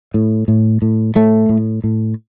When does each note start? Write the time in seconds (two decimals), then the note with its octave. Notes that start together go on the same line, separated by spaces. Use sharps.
0.14 A2
0.48 A2
0.82 A2
1.15 A2 A3
1.49 A2
1.84 A2